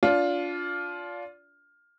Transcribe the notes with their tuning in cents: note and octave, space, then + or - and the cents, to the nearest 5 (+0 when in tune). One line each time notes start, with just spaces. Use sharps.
D4 -25 F4 +10